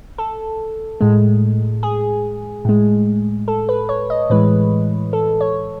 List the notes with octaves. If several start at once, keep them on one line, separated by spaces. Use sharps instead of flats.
A4
A2 G#3
G#4
A2 G#3
A4
B4
C#5
D#5
A2 E3 G#3 B4
A4
C#5